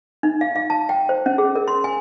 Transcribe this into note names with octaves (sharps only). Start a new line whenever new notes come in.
D#4
F5
F5
A5
G5
C5
C#4
G#4
A#4
C6
G#5